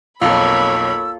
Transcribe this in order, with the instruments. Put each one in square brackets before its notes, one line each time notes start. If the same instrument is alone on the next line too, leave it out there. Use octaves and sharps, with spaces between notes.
[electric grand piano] B1 F2 [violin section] A#3 C#5 B5 [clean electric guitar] F4 A4 [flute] E6